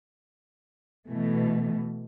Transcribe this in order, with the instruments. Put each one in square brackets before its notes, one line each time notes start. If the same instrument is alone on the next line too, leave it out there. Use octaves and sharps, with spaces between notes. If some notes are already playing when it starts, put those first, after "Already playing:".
[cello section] B2 E3 A3